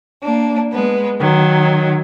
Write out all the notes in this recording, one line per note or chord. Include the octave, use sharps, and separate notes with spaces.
A#3 D4
G#3 B3
D#3 F#3